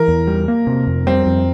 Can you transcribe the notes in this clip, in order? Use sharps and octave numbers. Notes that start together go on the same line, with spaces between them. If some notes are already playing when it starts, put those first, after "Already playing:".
Already playing: E3 A#4
E2
G3
A#3
C3
F2
G3 C4
F2